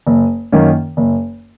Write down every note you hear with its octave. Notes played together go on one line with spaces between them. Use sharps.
F#1
F#2 D#3 A#3 C#4
F#1